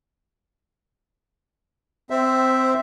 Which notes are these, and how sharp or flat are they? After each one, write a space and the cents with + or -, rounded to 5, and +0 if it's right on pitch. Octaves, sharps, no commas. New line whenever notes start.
C4 -15 C5 +0 E5 +0